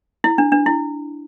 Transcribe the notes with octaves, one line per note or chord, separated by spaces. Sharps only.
E4
D4
D4
E4